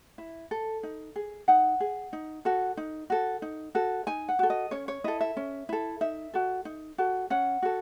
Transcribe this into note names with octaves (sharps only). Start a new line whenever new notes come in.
E4
A4
D#4
G#4
D#4 F#5
G#4
D#4
F#4 A4
D#4
F#4 A4
D#4
F#4 A4
D#4 G#5
F#5
F#4 A4
D#5
C#4 C#5
C#5
E4 A4 D#5
E5
C#4
E4 A4
D#4 E5
F#4 A4
D#4
F#4 A4
C#4 F#5
F#4 A4